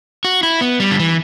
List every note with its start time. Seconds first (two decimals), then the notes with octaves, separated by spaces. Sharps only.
0.25 F#4
0.43 E4
0.61 B3
0.80 G3
0.91 D3
0.99 E3